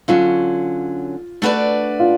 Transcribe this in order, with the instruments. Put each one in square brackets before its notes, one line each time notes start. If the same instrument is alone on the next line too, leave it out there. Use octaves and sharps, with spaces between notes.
[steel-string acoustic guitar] D3 F#3 C#4 [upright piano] F4
[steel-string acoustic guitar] A3 D4 F#4 B4 D5
[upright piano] F4